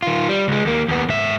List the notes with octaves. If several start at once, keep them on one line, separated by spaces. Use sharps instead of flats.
D#3 F4
G3
C#2 G#3
D#2 A#3
D#2 B3
G#2 E5